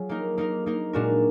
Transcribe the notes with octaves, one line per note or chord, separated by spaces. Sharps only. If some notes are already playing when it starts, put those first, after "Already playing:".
Already playing: F#3 F4 G#4
A#3 D#4 A#4
A#3 D#4 A#4
A#3 D#4 A#4
A#2 G#3 D4 F#4 A#4